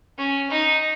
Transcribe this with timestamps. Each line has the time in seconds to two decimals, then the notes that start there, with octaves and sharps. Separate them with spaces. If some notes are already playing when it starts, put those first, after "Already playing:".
0.18 C#4
0.51 D#4